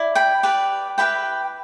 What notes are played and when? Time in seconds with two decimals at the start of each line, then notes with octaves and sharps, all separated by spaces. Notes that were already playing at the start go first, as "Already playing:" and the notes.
Already playing: E4 D5
0.15 G5 B5
0.43 G4 B4 D5
0.98 E4 G4 B4 G5 B5